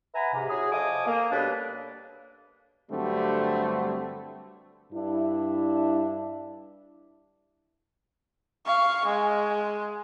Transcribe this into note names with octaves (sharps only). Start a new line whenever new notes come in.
B4 E5 F#5 G#5 A#5 B5
G#2 C3
C#4 E4 F#4 G#4
F3 A4 D#5 G#5 D6 D#6
A#3
B2 G3 C#4 D4 A4 B4
G2 D3 F#3 G3 A3 C4
G2 D4 E4
F5 C#6
G#3